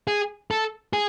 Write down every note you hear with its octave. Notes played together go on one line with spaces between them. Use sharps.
G#4
A4
G#4